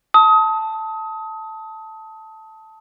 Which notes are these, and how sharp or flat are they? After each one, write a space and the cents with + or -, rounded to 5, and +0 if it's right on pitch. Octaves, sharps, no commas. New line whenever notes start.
A5 +0 D#6 +30